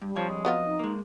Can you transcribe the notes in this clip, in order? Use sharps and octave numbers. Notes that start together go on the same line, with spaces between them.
G2 G3
F2 F3 C#5
G#3
F#3 B3 F4 D#5
D#4
G#3 A#3